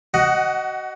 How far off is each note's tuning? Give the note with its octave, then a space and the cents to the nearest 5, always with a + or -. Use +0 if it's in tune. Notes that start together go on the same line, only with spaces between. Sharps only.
F#4 +30 D#5 +0 F#5 +5